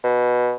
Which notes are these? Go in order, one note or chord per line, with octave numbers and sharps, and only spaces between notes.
B2